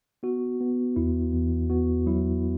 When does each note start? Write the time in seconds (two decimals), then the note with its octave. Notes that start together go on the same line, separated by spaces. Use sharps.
0.23 B3 F#4
0.60 B3
0.96 E2 E4
1.33 E2
1.70 B3 F#4
2.06 F#3 E4